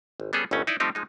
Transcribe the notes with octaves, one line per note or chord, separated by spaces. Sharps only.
G#1
G3 B3 C#4 G#4 A4
G1 D#2 C#3 A3 C#4
D#4 E4 D5 D#5
F3 G3 A3 C4 D#4 G4
F3 G#3 D#4